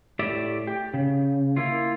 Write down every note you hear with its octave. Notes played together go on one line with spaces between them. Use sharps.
A2 G4 D5 E5
G4
C#3
A#3 E4 F4